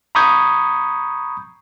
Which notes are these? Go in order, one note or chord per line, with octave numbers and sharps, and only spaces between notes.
A#5 B5 C#6 D#6 G6 G#6